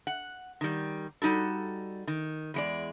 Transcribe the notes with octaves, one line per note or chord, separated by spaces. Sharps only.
F#5
D#3 G3
G3 D#4 F#4 A4
D#3
E2 G#3 D5